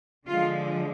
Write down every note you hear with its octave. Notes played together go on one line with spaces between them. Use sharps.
D3 F3 G#3 F4